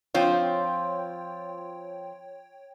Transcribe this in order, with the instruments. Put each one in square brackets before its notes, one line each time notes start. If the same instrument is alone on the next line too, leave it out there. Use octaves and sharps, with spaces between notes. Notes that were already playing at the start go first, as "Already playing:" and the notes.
[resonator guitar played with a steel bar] F3 C4 F4 [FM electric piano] C#5 G5